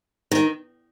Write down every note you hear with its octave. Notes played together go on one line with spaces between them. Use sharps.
D#3